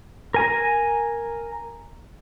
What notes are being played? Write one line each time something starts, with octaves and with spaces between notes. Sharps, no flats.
A#4 G#5 A#5